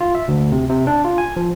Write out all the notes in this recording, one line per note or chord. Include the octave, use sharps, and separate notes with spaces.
F4
E5
D2
C3
C3
D4
F4
G#5
F3